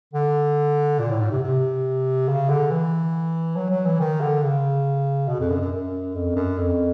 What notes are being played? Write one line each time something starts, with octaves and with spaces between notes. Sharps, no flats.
D3
A#2
A2
G#2
C3
C3
C#3
D3
E3
F#3
F#3
E3
D#3
D3
C#3
B2
F2
F#2
F#2
F#2
F2
F#2
F2